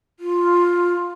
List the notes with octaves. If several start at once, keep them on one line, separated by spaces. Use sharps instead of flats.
F4